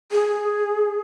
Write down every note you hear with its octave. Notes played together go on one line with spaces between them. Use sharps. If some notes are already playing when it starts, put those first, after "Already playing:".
G#4